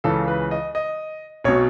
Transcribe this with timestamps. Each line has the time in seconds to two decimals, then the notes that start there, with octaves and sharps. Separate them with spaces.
0.04 C#2 C#3 E3 A4
0.28 B4
0.51 D#5
0.75 D#5
1.44 B1 B2 C#5